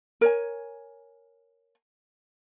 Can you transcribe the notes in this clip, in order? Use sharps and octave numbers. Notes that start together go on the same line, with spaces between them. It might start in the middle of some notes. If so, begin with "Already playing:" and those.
A#4 C#5 G#5